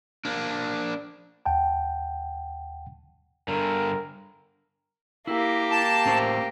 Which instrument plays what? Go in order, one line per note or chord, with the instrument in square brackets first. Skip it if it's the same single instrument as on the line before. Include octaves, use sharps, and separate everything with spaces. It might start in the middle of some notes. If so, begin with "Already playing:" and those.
[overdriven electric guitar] A#3 D4
[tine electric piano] D#2 F#5 G5 A5
[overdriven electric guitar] G2 D3 [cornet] A#4
[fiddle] A#3 G4 [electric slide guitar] E4
[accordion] A5
[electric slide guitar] A2 C#4 C5